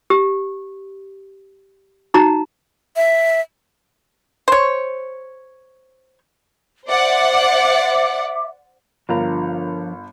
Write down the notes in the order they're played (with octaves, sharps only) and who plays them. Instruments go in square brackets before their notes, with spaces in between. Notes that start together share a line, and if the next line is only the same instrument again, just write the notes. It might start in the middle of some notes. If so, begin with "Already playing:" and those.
[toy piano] G4
D#4 F#4 A#5
[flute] E5
[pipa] C5 C#5
[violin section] C5 D5 F#5 [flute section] E5 D6
[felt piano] G1 [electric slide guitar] F3 D4 A#5 [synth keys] F4 A#4 F5